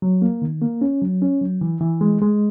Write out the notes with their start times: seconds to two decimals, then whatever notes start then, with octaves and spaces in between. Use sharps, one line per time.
0.02 F#3
0.22 A#3
0.42 D#3
0.62 A#3
0.81 C#4
1.02 F#3
1.22 C#4
1.41 F#3
1.61 E3
1.81 E3
2.01 G#3
2.22 G#3